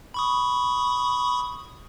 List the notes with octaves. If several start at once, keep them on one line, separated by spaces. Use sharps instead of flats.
B5 C#6 D#6